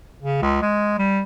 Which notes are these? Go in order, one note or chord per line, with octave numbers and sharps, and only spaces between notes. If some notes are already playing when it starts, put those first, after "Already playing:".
C#3
C#2
G#3
G3